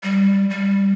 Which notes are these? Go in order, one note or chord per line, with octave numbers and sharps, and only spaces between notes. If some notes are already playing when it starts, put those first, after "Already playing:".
G3
G3